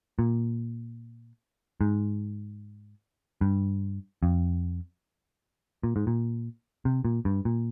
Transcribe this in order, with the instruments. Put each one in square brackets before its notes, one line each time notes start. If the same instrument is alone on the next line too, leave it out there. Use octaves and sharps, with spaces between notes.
[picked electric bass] A#2
G#2
G2
F2
A#2
G#2
A#2
C3
A#2
G2
A#2